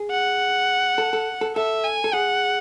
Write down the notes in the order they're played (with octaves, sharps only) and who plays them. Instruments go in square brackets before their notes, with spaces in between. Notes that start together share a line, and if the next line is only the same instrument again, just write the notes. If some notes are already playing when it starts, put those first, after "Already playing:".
Already playing: [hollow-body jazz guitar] G#4
[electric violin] F#5
[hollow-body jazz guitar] A4
A4
A4
[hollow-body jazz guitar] A4 [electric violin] E5
[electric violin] G#5
[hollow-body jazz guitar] A4
[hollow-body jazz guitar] G#4 [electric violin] F#5